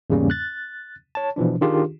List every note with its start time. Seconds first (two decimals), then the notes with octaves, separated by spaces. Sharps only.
0.10 E2 G#2 C#3 G3 A#3 C#4
0.30 F#6 A6
1.15 C#5 A5
1.36 B2 E3 F3 D4
1.61 D#3 D4 F4 G4 G#4